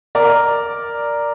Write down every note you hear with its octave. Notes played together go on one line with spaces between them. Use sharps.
A#4 D5